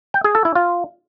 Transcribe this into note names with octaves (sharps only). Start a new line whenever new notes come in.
G5
G#4
A4
E4
F4